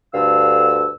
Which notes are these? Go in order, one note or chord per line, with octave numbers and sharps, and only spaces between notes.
D2 G2 D3 F5 E6